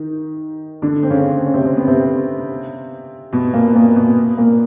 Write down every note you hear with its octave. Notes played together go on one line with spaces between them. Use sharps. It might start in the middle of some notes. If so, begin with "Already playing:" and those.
Already playing: D#3 D#4
D3 D4
C4
C#3 C#4
C4
C#4
C3 C4
C4
B3
C3 C4
B2 B3
A#2 A#3
A#2 A#3
B2 B3
A#2 A#3